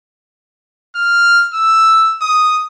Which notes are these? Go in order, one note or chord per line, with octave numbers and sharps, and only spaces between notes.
F6
E6
D#6